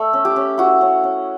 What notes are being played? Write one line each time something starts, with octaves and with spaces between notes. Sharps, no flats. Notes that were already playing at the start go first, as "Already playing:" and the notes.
Already playing: A3 E5
C#4
G4
C#4
E4 F#4
C#4
C#4